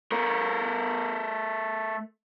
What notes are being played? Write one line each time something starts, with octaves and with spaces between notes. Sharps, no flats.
A3 A#4